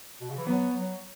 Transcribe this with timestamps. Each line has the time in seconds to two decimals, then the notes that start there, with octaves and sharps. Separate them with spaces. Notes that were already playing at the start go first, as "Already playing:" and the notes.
0.21 B2
0.30 C#3
0.38 E3
0.47 F#3 B3
0.74 F#3